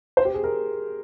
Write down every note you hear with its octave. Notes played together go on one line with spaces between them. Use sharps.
C5
G4
G#4
A#4